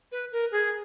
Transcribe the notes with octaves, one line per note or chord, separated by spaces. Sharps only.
B4
A#4
G#4